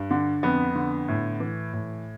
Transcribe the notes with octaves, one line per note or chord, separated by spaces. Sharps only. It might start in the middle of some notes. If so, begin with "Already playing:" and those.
Already playing: G2
D3
F2 B3
D3
A2
E3
A2